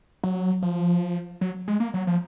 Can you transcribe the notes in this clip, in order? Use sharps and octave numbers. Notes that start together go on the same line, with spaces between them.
F#3
F3
F#3
G#3
A#3
F#3
F3